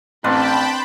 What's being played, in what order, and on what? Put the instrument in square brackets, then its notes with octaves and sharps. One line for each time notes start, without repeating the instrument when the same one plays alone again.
[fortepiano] A1 [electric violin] C4 [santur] D4 B4 C5 [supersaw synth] G5 A5 B5